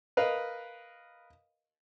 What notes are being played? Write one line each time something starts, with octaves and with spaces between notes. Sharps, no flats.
A#4 B4 D#5 F5